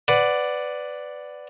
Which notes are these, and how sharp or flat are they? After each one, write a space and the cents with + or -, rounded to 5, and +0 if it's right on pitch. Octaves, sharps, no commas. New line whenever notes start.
B4 +20 D5 +0 F#5 +0